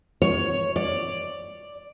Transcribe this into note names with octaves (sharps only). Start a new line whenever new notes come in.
C#5
D5